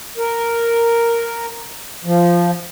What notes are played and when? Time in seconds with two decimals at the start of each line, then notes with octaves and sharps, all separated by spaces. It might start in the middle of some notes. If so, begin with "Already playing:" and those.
0.18 A#4
2.05 F3